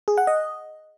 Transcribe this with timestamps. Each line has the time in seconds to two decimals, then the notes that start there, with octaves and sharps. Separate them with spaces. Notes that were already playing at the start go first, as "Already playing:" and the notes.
0.08 G#4
0.18 F#5
0.27 D#5